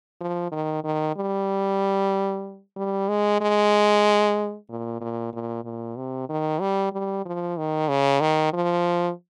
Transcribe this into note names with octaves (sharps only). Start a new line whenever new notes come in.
F3
D#3
D#3
G3
G3
G#3
G#3
A#2
A#2
A#2
A#2
C3
D#3
G3
G3
F3
D#3
C#3
D#3
F3